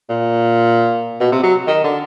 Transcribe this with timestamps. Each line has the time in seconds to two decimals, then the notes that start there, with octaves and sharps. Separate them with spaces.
0.09 A#2
1.20 B2
1.32 C3
1.43 F#3
1.67 D#3
1.84 D3